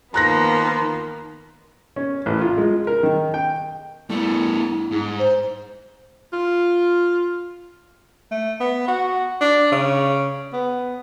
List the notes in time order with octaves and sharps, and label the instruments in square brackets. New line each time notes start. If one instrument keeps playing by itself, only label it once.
[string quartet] D#3 A#3 B3 [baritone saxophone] F3 [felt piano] A#5 F#6 A#6
[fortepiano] C#4
A1
F4
G#3
A#4
D#3
G5
[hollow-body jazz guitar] G2 [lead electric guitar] A3 B3 [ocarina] E4
[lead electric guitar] G#2
[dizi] C5
[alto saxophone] F4
[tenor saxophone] A3
B3
F#4
D4
C#3
B3